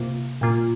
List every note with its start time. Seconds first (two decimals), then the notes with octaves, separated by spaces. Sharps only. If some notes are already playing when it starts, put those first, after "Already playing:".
Already playing: C3 A#3 F4
0.41 A#2 A#3 F4